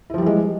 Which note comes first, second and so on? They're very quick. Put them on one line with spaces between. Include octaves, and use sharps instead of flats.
E4 F3 G3 E3 G#3